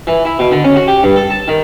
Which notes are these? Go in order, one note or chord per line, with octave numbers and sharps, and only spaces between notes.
E3
E4
B2
D3
C#4
F#4
G4
G2
A4
A5
D#3